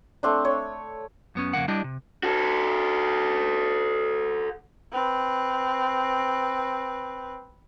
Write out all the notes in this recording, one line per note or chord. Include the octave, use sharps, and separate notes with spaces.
A3 C4 D4
C#5
F#2 B3 C#4
F2 C#3 G3 A#3 F#5
G3 D4 E4 G4 D#5
C3
F#4 A4
C4 B4